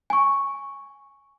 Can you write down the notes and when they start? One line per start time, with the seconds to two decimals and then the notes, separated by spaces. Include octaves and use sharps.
0.10 G#5 C#6